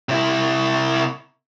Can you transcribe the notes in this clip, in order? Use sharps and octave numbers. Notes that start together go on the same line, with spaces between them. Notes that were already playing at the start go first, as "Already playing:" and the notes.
C3 E4